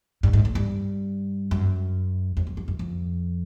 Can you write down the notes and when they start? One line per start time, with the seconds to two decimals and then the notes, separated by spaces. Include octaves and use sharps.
0.23 G2
0.33 G#2
0.45 A2
0.55 G2
1.51 F#2
2.37 F2
2.47 F#2
2.57 F#2
2.68 F#2
2.79 F2